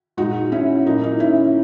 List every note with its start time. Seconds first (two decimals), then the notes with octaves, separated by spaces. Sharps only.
0.17 A#2 G#3 D#4 F#4
0.52 C#4 E4
0.86 A#2 F#3 A#3 D#4
1.04 D#4
1.20 C#4 E4